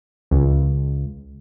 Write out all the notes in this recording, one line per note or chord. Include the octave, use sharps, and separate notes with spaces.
C#2